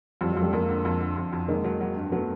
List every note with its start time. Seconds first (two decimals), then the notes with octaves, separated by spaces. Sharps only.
0.21 F2 F3 G3
0.32 F#3 G#3
0.37 F2
0.42 G3 A3
0.53 F2 G#3 A#3
0.69 D3
0.85 F2
1.01 D3
1.17 F2
1.33 F2
1.48 D#3 G#3 A#3
1.64 F#3
1.81 F#3
1.96 G2
2.12 F#3 A3 B3